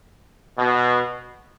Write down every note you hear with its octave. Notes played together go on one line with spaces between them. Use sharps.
B2